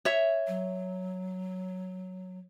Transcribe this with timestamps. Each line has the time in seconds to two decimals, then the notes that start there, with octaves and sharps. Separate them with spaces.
0.05 C#5 E5
0.47 F#3